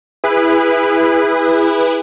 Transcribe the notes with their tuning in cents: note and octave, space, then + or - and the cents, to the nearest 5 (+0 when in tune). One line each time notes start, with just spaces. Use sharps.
E4 +5 G#4 -30 B4 +0